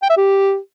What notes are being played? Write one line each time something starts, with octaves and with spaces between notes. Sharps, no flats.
G5
E5
G4